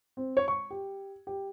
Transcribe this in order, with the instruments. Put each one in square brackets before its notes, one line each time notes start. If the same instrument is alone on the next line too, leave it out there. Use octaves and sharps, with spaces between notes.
[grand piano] C4
C#5
C#6
G4
G4